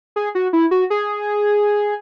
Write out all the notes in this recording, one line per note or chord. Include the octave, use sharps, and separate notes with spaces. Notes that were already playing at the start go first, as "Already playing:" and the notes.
G#4
F#4
E4
F#4
G#4